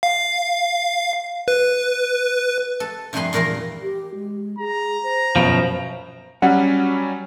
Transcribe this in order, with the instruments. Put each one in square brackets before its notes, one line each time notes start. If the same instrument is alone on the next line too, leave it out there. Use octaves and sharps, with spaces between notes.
[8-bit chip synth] F5
B4
[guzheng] A4
G2 C3 F3 G#4 B4 C6
E2 A#2 A#4 F5 A#5
[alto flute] G4
G#3
[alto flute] G#4 [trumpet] A#5
[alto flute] C5
[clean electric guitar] F#2 B2 F3
[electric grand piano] F#3 G3 C#4 [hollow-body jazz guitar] F#5